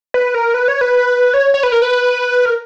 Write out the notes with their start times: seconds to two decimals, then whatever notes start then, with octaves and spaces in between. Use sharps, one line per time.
0.14 B4
0.34 A#4
0.54 B4
0.68 C#5
0.81 B4
1.34 C#5
1.54 C#5
1.63 B4
1.72 A#4
1.82 B4
2.45 A#4